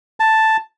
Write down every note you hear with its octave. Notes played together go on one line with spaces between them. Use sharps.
A5